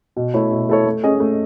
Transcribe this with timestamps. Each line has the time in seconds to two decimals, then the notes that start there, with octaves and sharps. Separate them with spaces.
0.16 B2
0.34 A3 E4 A4 C#5
0.51 B2
0.69 A3 E4 A4 C#5
0.86 A3
1.04 C#4 G#4 D#5
1.20 A3